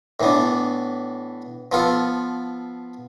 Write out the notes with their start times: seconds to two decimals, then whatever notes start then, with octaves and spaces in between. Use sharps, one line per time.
0.20 A2 E3 B3 D4
1.72 F3 B3 F4 A4